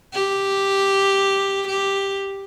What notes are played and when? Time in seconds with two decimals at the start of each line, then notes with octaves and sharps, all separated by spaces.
0.13 G4
1.68 G4